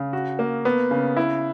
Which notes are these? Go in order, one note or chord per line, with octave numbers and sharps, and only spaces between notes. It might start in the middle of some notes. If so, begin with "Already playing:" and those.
Already playing: C#3
F#4
A#3
B3
C#3
E4